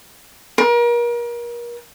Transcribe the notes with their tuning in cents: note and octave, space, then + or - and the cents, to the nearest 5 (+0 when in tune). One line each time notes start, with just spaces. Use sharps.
A#4 +35